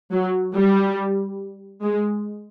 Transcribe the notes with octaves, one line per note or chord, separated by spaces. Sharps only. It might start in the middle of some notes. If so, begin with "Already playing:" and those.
F#3
G3
G#3